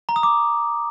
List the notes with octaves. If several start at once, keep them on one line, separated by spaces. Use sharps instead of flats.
A#5
D#6
D6